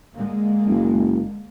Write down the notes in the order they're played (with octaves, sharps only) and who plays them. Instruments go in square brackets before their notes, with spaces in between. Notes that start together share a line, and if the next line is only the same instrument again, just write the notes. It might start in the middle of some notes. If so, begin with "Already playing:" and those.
[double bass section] D3 G#3 A#3
[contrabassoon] F#1